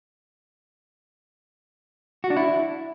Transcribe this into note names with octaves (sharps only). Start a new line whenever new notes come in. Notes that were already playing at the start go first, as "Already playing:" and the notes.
F#4
D4
E4